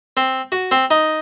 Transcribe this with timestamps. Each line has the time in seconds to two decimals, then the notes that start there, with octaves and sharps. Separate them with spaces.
0.17 C4
0.52 F#4
0.71 C4
0.91 D#4